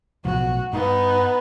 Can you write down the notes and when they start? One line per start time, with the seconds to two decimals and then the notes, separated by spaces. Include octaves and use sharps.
0.25 B1 A2 F3 F#4
0.73 G2 B3 D#4